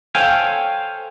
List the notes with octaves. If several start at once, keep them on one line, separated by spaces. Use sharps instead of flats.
A4 C5 C#5 F5 G5 G#5